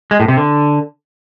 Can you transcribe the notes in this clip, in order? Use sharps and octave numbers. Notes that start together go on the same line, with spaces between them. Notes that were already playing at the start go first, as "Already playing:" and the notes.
G#3
A2
C3
D3